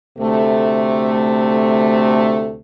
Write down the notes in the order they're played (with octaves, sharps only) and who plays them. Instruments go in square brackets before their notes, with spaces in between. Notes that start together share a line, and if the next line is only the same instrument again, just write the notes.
[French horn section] D2 C3 A3